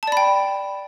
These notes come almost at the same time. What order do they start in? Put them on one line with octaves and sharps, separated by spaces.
A5 D5 B5 G5